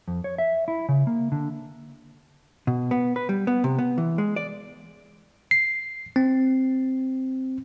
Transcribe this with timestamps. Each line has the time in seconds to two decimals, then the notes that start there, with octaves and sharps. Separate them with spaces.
0.08 F2
0.24 C#5
0.38 E5
0.68 E4
0.89 C#3
1.07 A#3
1.32 D3
2.67 B2
2.91 B3
3.16 B4
3.29 G3
3.47 B3
3.64 C3
3.79 B3
3.98 E3
4.18 G#3
4.36 D5
5.51 C7
6.16 C4